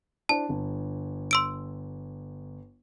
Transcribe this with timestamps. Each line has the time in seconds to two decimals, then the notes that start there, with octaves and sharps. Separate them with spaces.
0.29 D4 E4 C5 A5
0.49 G1
1.31 C6 E6 D7